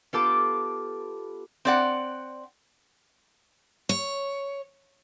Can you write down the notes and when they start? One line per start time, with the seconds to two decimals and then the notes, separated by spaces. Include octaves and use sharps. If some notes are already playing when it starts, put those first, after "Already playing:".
0.13 B3 F4 G4 A4 A5 D6
1.65 C4 D5 F#5
3.89 C#5